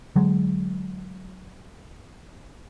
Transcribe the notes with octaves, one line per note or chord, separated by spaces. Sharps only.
D3 F#3 G#3